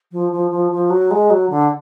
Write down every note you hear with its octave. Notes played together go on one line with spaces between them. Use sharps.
F3
F3
F3
F3
F#3
G#3
F#3
D3